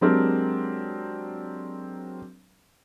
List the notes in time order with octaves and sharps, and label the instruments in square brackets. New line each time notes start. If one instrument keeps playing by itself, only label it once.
[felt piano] F#3 G#3 C4 D4 G4 A#4